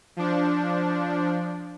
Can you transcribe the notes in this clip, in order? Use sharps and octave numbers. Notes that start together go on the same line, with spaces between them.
F3 D4